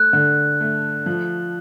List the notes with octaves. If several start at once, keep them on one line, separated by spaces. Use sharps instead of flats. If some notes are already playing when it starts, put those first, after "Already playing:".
Already playing: A3 F#6
D3
A3
F3